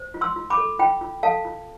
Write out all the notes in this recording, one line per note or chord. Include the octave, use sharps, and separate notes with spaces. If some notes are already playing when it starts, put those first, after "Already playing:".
Already playing: C5
F4
C6 E6
F4
B5 D6
A4
F4 G5 B5
F4
A4 F5 A5
F4